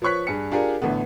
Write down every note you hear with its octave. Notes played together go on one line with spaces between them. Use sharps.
F3 B4 C#5 C#6 F#6 B6
G2 G#4 C#7
D4 F4 G4 G#4 A#4 D5
A1 D3 A3 B3